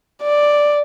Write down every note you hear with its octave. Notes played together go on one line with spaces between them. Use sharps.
D5